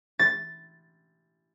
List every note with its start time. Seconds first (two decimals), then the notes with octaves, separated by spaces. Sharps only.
0.19 A6